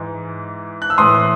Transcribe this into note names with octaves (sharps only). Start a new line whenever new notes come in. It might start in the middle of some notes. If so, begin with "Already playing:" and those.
Already playing: G#2 E3
F#6
E6
A2 E3 C6 D#6